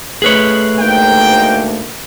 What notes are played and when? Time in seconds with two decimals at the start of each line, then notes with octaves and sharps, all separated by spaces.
0.22 A3 G#4 B4 C#5
0.78 D2 G#2 A#3 G5